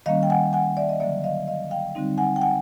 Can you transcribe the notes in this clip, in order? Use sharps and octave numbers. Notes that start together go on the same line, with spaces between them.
D#3 G3 A#3 C#4 D#5 F5
G5
F#5 G#5
F#5 G#5
D5 E5
D#5
D3 F#3 A#3 D5 E5
D#5 F5
D#5 F5
F5 G5
D3 G3 C4 D#4
F#5 G#5
G5
F#5 G#5